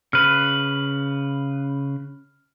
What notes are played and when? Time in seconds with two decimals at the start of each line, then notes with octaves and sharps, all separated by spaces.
0.13 C#3 B4 F6